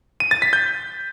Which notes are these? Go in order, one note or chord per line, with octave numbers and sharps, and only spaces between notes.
D#7
A6
B6
G6